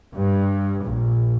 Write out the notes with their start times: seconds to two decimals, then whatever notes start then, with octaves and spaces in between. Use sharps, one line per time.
0.14 G2
0.85 A#1